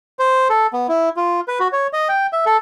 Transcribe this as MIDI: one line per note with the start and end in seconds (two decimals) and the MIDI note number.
0.19 0.48 72
0.50 0.67 69
0.73 0.87 59
0.89 1.09 64
1.17 1.40 65
1.48 1.59 71
1.60 1.68 66
1.73 1.87 73
1.93 2.08 75
2.09 2.27 79
2.33 2.45 76
2.46 2.57 69